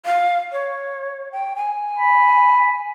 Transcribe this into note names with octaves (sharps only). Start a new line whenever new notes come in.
F5
C#5
G5
G#5
B5